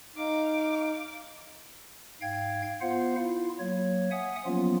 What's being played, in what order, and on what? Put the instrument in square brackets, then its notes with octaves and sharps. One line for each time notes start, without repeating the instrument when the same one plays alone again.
[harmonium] D#4 [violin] F5 D6
[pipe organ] G#2 F5 G5 G#6
B3 F4 C5 F5 F#5
E4 F4
F#3 A#3 C#5
E5 F#5 G#5 D#6
F3 F#3 A#3 B3 C#4 F4